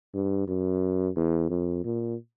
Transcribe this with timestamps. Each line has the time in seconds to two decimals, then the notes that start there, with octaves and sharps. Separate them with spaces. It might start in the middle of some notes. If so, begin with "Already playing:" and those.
0.14 G2
0.48 F#2
1.17 E2
1.50 F2
1.84 A#2